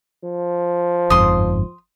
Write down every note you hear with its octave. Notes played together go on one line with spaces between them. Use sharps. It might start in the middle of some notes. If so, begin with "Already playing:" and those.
F3
G1 F2 G#2 C6 D#6